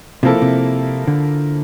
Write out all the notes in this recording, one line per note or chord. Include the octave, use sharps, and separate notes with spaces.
C3 F3 A#3 E4 A4
C3
D3